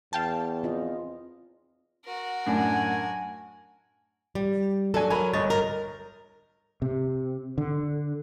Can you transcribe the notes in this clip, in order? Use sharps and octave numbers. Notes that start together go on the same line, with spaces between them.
E2 F5 G5 A5
C4 F4 D#5
F#4 A#4
F#2 A2 D4 G#5
G3
F#3 D4 A4 G#5
F#3 A#4 G#5 B5 D#7
G1 C#5 D#5 A6
A#4
C3
D3